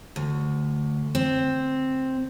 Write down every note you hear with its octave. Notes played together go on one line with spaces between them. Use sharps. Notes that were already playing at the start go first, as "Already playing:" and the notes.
D2
C4